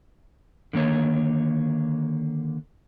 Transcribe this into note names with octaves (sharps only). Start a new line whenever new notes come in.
D3 D#3 A#3 C#5